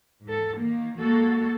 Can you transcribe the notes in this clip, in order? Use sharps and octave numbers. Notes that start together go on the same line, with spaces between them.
G#2 A4
D#3 A#3
G#3 A#3 F#4 A4